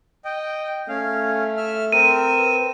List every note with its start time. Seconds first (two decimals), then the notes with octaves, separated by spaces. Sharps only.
0.25 D#5 G5
0.88 A3 C#4 F5
1.57 E5 F6
1.92 C4 A#4 E6 D#7
2.36 B4